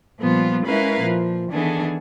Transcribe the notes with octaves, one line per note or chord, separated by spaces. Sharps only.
A#2 F3 G3 B3 F4
G#3 C#4 E4 A#4 B4 F5
A#2 F3
D#3 E3 B3 D4 G#4 A4